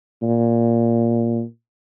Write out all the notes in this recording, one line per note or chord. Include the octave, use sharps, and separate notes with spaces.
A#2